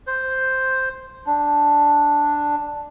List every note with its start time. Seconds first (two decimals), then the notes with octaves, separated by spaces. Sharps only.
0.07 C5
1.26 D4